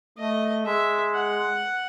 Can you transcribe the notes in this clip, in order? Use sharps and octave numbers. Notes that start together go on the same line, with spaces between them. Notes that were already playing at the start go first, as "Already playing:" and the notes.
A3 D#5
G#3 E5
F#5